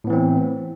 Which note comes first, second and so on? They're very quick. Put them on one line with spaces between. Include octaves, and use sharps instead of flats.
A2 B3 E3 C4